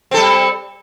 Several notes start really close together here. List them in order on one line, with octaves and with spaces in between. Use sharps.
C4 A4 G3